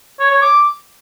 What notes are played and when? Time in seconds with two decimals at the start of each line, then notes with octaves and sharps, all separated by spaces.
0.20 C#5
0.31 C#5
0.42 D6